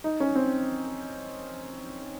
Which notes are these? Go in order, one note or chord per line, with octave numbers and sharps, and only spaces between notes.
D#4
C#4
C4